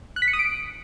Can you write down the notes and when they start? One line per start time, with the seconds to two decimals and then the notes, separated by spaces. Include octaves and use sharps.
0.16 F#6
0.22 B6
0.28 C#7
0.33 D#6
0.39 D7